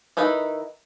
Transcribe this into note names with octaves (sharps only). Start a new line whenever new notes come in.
D#3 D#4 E4 B4